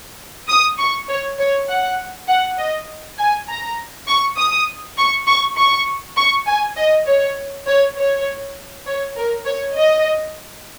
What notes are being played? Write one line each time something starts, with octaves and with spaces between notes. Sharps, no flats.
D#6
C#6
C#5
C#5
F#5
F#5
D#5
G#5
A#5
C#6
D#6
C#6
C#6
C#6
C#6
G#5
D#5
C#5
C#5
C#5
C#5
A#4
C#5
D#5